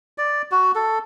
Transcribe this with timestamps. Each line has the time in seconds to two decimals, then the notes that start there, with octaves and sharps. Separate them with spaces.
0.18 D5
0.52 F#4
0.75 A4